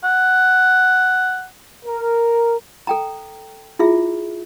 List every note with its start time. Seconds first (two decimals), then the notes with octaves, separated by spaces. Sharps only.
0.04 F#5
1.85 A#4
2.87 A4 G5 A#5
3.79 E4 F4 G#4 E5